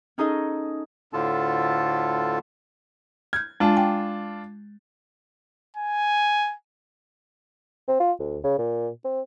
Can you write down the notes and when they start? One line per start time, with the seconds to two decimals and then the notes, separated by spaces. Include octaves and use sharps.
0.18 C#4 D#4 G#4 A4 D#5
1.13 D2 A2 D3 F4 A4 A5
3.33 F6 G6 G#6
3.60 G#3 D4 F4 A5
3.77 G5 G#5 D6
5.77 G#5
7.88 C4
8.00 F4
8.19 D2
8.44 C#3
8.58 A#2
9.05 C4